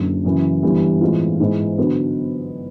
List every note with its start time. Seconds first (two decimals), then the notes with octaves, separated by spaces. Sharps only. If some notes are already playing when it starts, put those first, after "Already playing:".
Already playing: F#1 F#2 D3
0.25 F#2 C#3 E3
0.63 G1 G2 E3 G3
1.01 A2 E3 G#3 C4 F4
1.40 G#2 E3 G#3
1.78 D3 F#3 B3